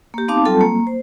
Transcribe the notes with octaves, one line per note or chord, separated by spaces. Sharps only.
A#3 G4
B3 C4 D#4 F5 A5 D6
F#3 G3 C4 F4 A4 A5
A#3
C5